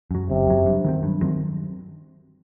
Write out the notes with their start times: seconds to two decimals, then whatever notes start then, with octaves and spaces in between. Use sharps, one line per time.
0.11 F#2 F#3
0.30 F#1 C3
0.47 F#2 F#3
0.66 G2
0.84 D#3 F#3 C4
1.03 G2
1.22 D#3 F#3 C4